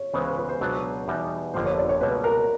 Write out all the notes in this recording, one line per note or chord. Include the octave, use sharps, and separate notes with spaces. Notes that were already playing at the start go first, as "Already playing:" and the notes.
Already playing: C#5
C#2 C#3 E3 G#3 B3 C5
C5
B4
C5
C#2 B2 F#3 B3 D4
E2 B2 G3 B3 D#4
G1 F2 D3 F3 A#3 C5
C#5
D5
C#5
C#2 B2 G3 A#3 B4
A#4